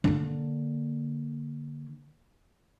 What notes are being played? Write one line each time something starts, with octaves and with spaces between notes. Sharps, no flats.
D3 A#3